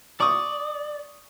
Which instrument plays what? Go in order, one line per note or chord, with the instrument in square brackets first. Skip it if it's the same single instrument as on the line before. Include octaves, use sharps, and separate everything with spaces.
[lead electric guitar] D5 [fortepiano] C#6 D#6